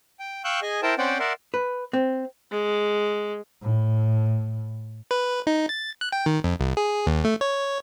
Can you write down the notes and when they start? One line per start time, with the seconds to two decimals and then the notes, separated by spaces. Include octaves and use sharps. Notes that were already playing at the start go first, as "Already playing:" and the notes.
0.20 G5
0.44 F5 G5 C#6 E6 F#6 G6
0.62 G#4 D#5 G#5
0.83 E4 A#4 C5 G5 A5
0.98 C4 C#4 C5 D5 F#5 G5
1.19 A#4 D5 E5 F#5 C6
1.54 B4
1.93 C4
2.51 G#3
3.62 A2
5.11 B4
5.47 D#4
5.69 A6
6.01 F#6
6.12 G5
6.26 D#3
6.44 F2
6.60 C2
6.77 G#4
7.07 D#2
7.25 A3
7.41 C#5